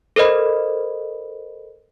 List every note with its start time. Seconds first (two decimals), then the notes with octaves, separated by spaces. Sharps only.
0.16 A4 A#4 C5 D#5 B5